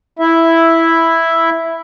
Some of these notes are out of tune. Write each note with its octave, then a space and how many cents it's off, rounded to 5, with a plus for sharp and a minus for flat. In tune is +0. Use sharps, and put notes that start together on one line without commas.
E4 +0 E5 +0